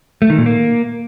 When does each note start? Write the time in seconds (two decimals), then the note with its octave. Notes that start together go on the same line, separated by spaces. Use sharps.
0.22 A3
0.30 D#3
0.38 A#2
0.46 A#3